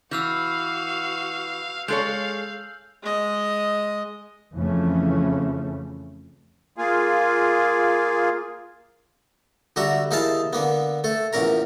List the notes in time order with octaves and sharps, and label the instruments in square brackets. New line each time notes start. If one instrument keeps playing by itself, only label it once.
[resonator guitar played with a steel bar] E3 [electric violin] F#4 F5 [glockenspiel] E6 F6 G6
[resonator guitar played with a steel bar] G#3 A4 C#5 [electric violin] F5 [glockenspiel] G6 F#7
[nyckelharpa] G#3 D#5
[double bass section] F2 C#3 E3 F3 A3 C#4
[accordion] A#3 F4 G#4
[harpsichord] D3 G3 F#4 E5 A#5
D#2 D#4 E4 G#4 F5 A5
D3 A#3 B3
A3 A4
A#1 E2 C#4 A#4 A#5